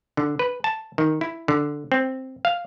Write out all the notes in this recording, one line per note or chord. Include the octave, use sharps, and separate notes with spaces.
D3
B4
A5
D#3
E4
D3
C4
F5